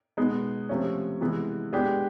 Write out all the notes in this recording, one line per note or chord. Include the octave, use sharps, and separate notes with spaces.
B2 G#3 B3 D#4
C3 F3 A3 C#4
C3 E3 G#3 B3
G#3 B3 D4 G4